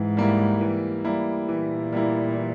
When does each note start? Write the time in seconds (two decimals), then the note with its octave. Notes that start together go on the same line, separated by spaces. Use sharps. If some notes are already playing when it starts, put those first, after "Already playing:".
Already playing: G#2 E3
0.17 G3 A#3 E4
0.61 E3
1.05 G3 A#3 E4
1.48 A#2 E3
1.93 G3 A#3 E4
2.37 E3